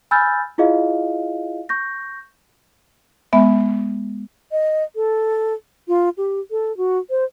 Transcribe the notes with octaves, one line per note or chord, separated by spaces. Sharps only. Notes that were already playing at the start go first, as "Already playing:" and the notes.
G#5 B5 E6 F6 G6 A6
E4 F4 G#4 D#5 F5
C#6 G6 A#6
G#3 B3 E5
D#5
A4
F4
G4
A4
F#4
C5